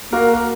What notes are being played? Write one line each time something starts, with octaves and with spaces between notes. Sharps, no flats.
A#3 F#4 A#4
A#4